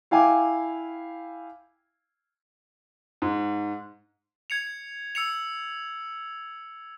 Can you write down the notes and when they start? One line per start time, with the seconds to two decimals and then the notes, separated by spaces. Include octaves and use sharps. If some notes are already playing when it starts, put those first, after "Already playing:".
0.11 E4 F5 G5 G#5 D6
3.22 G#2
4.50 G#6 C#7 F7
5.15 E6 C#7 F7